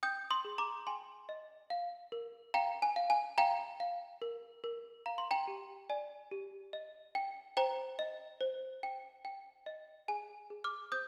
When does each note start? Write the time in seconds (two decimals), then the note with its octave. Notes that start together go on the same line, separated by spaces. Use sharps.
0.03 G5 D#6 G6
0.30 C6 D#6
0.45 G#4
0.58 A#5 D6
0.87 G5 G#5 C6
1.29 D#5
1.70 F5
2.12 A#4
2.54 F5 G5 A#5
2.82 G#5
2.96 F5
3.10 G#5
3.38 F5 G5 A#5
3.80 F5
4.22 A#4
4.64 A#4
5.06 F5 A#5
5.18 C6
5.31 G5 A#5
5.47 G4
5.90 D5 G#5
6.31 G4
6.73 D#5
7.15 G5
7.57 C5 G5 A#5
7.99 D#5
8.41 C5
8.83 G5
9.25 G5
9.66 D#5
10.08 G#4 G#5
10.50 G#4
10.64 D6 F6
10.92 C5 D#6 G6